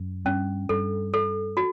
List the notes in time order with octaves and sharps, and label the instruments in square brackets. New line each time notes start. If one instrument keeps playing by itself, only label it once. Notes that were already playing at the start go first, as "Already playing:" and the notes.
Already playing: [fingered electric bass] F#2
[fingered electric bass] G2 [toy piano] C#4
[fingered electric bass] G2 [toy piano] A4
[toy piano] A4
F#4